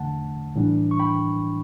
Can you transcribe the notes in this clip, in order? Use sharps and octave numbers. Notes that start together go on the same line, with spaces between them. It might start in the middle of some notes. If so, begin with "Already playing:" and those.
Already playing: E2 D3 A3 F#5 A5
A2 E3 G3 D4
C#6
G5 B5